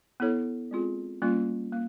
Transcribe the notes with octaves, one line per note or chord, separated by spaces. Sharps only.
B3 E4 A4 C#5
G#3 C4 F4 G#4
G3 A#3 C#4 F4
A#3